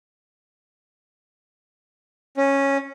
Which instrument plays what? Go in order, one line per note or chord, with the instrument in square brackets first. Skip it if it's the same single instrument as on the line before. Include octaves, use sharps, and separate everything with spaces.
[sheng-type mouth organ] C#4